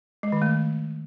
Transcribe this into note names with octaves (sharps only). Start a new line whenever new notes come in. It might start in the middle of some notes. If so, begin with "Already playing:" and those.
G#3
D#3
A3